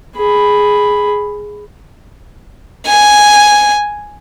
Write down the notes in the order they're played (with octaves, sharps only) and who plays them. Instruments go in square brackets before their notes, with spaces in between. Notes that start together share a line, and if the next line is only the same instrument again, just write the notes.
[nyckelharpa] G#4 B5
[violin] G#5